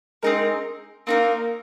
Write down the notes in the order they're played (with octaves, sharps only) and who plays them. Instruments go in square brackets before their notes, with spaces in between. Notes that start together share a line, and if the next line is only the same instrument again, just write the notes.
[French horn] G#3 [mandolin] C4 D#4 A#4
[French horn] A#3 [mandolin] C4 D#4 A#4